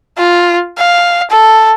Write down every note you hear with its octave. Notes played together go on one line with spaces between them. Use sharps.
F4
F5
A4